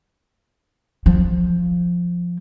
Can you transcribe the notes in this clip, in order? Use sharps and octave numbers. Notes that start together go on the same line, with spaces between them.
F3